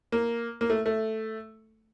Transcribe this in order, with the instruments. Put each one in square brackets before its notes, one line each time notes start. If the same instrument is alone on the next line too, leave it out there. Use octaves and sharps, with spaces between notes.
[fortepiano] A#3
A#3
A3
A3